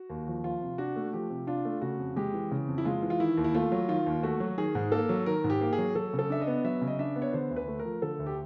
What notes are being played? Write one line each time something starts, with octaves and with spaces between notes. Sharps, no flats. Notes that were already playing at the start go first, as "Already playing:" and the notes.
Already playing: F#4
D#2
F3
F3 F4
C3
D4 F#4
A3
F3 G4
C3
D4 F4
A3
C#3 F#4
F2
G#3 G4
E3
C#3
F2
E4
G#3 F4
E3
F4
D#3 E4
D#2
E4
A3 F4
F#3
D#3 F4
D#2
A3 F#4
F#3
D#3 G#4
G#2
A#3 A4
F#3
D#3 A#4
G#2
G4
A#3
G#4
F#3
F#3 A4
C#3
A4
D4 E5
D#5
B3
F#3 E5
C#3
D#5
D4 E5
B3
C#5
D3 C5
D2
B4
A3
A#4
F3
D3 A4
D2
G4